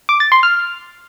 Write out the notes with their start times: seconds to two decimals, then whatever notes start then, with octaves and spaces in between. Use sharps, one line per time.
0.09 D6
0.20 A6
0.32 C6
0.43 F6